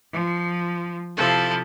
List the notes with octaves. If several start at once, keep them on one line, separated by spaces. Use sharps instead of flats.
F3
C3 F3 E4 A4